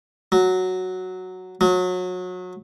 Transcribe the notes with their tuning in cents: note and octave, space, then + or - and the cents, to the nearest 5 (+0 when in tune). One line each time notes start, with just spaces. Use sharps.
F#3 -5
F#3 -30